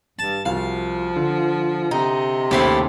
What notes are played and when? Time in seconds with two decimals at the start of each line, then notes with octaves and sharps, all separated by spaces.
0.19 G2 A5
0.45 C2 F3 F#4 F5
1.16 D3
1.91 C3 D#4
2.51 D#2 C#3 A3 B3 E4 G4 A4 C5